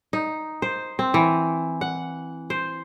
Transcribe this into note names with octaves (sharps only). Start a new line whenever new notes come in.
D#4
C5
C4
E3
F#5
C5